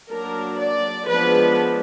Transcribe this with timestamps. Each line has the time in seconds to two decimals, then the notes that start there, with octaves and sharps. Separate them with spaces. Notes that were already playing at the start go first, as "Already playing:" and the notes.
0.11 F#3 A#3 D4 A#4
0.59 D5
1.08 F3 G#3 B3 D4 B4